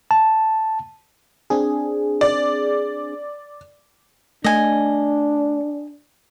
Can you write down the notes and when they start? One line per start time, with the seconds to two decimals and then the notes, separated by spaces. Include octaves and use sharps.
0.11 A5
1.50 C4 D4 G#4
2.21 D5
4.44 A3 D4 D#5 G#5